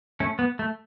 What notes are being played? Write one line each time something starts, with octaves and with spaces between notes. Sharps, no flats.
A3 C#4
B3
A3